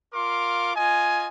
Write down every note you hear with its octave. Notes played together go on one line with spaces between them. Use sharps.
F4 A#4 F5 C6 D6
F4 D#5 G#5